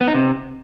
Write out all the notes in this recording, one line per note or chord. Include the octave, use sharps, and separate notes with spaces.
B3
D#4
C3